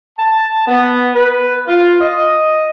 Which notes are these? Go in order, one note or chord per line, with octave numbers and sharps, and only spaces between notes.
A5
B3
B4
F4
D#5